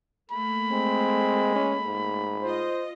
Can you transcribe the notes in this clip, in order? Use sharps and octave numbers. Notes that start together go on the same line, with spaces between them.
A3 A#3 B5
G#3 C4
C#4
G#2
F4 C5 D#5